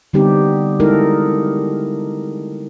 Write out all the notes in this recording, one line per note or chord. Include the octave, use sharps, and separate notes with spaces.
D3 G3 B3 C4 D#4 G4
G#3 D#4 E4 A4 A#4